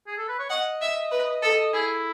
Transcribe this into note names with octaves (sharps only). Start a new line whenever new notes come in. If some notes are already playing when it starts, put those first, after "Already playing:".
G#4
A4
B4
C#5
D#5 F#5
E5
B4
A4
E4 G#4